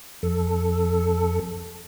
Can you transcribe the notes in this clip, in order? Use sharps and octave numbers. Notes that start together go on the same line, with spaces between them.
F2 A4